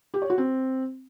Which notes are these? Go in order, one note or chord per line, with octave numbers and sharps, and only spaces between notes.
G4
C#5
F#4
C4